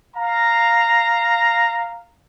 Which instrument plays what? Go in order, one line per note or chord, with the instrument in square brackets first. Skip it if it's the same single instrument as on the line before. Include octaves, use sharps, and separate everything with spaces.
[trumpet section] F5 A#5